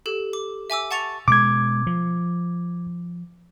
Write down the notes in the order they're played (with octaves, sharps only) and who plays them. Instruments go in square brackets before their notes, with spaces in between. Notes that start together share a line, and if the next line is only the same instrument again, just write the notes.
[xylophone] G4 A4
D6
E5 G#5 D6 E6
F#5 A5 C#6 A6 C#7 F7
[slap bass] B2 G#3 [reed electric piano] D6 G#6
[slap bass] F3